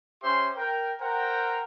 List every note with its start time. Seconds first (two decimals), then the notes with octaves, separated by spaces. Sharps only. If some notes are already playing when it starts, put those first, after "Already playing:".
0.23 C#4 G4 C5 E5 C6
0.56 A#4 G5
0.99 A#4 C5 F#5 G5 A#5